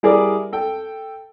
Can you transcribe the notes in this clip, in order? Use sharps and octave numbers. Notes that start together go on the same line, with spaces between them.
G3 E4 G#4 A#4 D5 D6
A4 G5